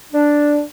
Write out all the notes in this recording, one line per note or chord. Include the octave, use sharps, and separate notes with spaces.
D4